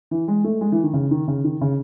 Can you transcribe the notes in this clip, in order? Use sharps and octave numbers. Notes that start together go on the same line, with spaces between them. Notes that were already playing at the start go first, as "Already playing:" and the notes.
E3
G#3
A3
G#3
E3
D#3
C#3
D#3
C#3
D#3
C#3